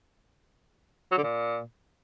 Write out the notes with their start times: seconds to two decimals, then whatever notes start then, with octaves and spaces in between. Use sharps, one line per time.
1.12 F#3
1.18 D3
1.24 A#2